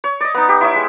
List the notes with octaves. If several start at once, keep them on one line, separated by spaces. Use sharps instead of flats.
C#5
D5 D#5
B3 D#4
G4
E4 C#5 E5
G#3